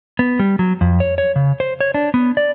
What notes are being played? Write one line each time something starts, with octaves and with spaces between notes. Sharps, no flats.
B3
G3
F#3
F2
C#5
C#5
C#3
C5
C#5
D4
B3
D5